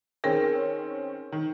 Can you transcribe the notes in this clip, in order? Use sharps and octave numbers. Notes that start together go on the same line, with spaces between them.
D#3 C4 C#4 G#4 A#4 G5
D#3